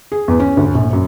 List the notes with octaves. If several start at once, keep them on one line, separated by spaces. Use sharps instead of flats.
G#4
E2
C#4
D2
A#1
F#2